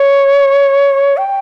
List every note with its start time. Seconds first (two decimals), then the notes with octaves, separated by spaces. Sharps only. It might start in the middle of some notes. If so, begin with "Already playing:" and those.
Already playing: C#5
1.17 G5